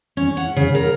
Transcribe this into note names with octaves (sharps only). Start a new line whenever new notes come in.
C#4
F#5
C#3
A#4